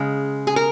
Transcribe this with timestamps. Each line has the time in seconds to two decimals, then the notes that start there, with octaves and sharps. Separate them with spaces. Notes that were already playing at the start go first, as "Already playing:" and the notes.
Already playing: C#3 G#3
0.47 G#4
0.56 A#4